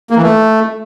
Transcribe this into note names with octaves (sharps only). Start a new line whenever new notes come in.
A#3
E3
A3